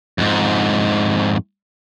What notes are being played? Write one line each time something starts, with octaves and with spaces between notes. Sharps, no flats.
F2 G#2